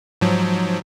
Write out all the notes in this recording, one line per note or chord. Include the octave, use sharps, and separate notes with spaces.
G#2 F3 F#3